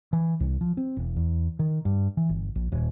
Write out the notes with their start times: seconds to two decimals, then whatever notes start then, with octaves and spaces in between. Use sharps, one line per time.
0.13 E3
0.40 C2
0.61 F3
0.77 C4
0.97 E1
1.16 E2
1.59 D#3
1.85 G2
2.17 E3
2.29 G1
2.55 A#1
2.72 D#1